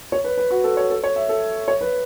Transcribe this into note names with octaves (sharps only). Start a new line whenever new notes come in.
C#5
B4
B4
F#4
A4
C#5
A4
C#5
E5
A4
C#5
B4